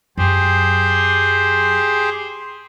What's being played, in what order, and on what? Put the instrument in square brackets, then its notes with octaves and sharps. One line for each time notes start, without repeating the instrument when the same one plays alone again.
[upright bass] F#2 F#3 [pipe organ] G4 G#4 C5